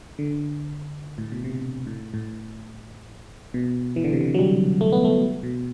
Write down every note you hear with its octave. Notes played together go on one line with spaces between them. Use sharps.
D3
A2
B2
C3
A2
A2
B2
E3
D3
C3
D3
F#3
G3
A3
B3
A3
B2